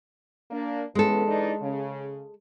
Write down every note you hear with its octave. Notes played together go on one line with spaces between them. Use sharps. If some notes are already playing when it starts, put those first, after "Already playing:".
A#3 D4
E3 G#3 B3 C#4 A4
E3 D4 D#4
C#3